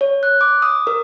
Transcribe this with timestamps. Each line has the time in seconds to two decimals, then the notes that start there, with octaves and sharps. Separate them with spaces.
0.01 C#5
0.23 F#6
0.41 D6
0.62 D#6
0.87 A#4